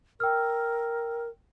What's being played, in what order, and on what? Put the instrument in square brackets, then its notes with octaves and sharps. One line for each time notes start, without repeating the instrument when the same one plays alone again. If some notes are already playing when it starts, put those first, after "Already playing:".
[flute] A#4 [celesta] G5 E6 F6